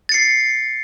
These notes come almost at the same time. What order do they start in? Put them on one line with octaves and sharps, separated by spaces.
A6 C#7 C7